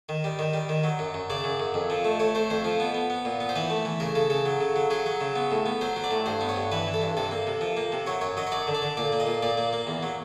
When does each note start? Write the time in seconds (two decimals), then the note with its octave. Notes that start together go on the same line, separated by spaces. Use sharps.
0.09 D#3
0.24 G3
0.39 D#3
0.53 G3
0.69 D#3
0.84 F#3
0.99 F#2
1.14 F#2
1.30 C#3 D5
1.44 F#2
1.60 F#2
1.74 F2
1.90 F3
2.05 A3
2.20 A3 C#5
2.35 A3 C5
2.50 F2 C5
2.65 F3
2.80 B3
2.95 B3
3.10 B3
3.25 A#2
3.40 B3
3.49 C5
3.56 E3 B4
3.70 A3
3.85 E3
4.00 C#3 A#4
4.15 C#3 A4
4.30 C#3 A4
4.45 F#3
4.61 C#3
4.76 F#3
4.90 F#3 G#4
5.06 F#3
5.21 C#3
5.36 B3
5.51 A2
5.66 B3
5.81 F#3 C5
5.96 F#3
6.04 D5
6.11 A2
6.26 G2 C5
6.41 B3
6.49 C#5
6.56 G2
6.72 E3 B4
6.87 E3
6.94 A4
7.02 G2
7.17 C3 A4
7.31 A#3
7.47 C3
7.61 F3
7.77 A#3
7.92 C3
8.07 F#3 C#5
8.21 F#2 C#5
8.37 F#3 D#5
8.47 C#5
8.52 F#2 D5
8.67 D3
8.75 D5
8.82 D3
8.97 A#2 D5
9.12 A#3
9.20 D#5
9.27 A#2
9.42 A#2 D5
9.57 A#3
9.73 A#3
9.87 E2
10.03 F#3